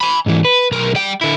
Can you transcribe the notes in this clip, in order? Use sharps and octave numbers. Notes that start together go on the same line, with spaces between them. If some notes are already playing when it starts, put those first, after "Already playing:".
G#5 B5
G#2 E3
B4
B1 A#4
G3 G5
D3 E4